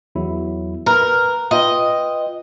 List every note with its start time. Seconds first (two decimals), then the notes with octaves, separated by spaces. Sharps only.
0.15 E2 F#3 E4
0.86 A#4 B4
1.51 F4 B4 D#5 G5